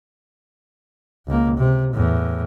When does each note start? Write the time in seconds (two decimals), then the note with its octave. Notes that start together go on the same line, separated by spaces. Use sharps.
1.27 C#2 A#3
1.57 C3
1.93 E2 A2